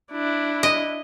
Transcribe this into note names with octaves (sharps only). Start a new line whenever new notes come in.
D4 E4
D#5